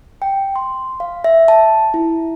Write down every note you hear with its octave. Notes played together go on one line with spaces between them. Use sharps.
G5
C6
F5
E5
A5
E4